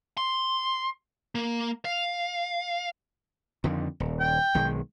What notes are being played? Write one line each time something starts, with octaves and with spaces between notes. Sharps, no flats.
C6
A#3
F5
F2 D3 D#3
D#1
G5
B1 D#3 G#3